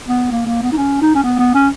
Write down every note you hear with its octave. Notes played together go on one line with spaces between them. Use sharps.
B3
A#3
A#3
B3
D#4
C#4
D#4
C#4
B3
B3
C#4